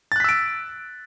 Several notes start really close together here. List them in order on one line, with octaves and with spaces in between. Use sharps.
A6 F#6 B6 E6 D7